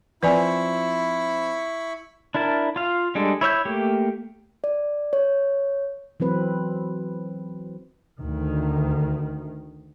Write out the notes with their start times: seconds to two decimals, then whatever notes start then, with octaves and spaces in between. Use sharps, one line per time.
0.23 F3 C4 E4 B4 D5 G#5 B5 C#6
2.35 D4 E4 A#4 A5
2.76 F4 F5
3.15 G3 G#3 D4 A4
3.41 E4 C#5 E5 G6
3.65 A3 A#3 G4
4.64 D5
5.13 C#5
6.20 E3 F#3 C4 B4
8.19 D2 D#3